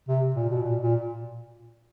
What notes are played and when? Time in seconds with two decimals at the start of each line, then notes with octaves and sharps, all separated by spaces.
0.08 C3
0.36 A#2
0.49 B2
0.63 A#2
0.81 A#2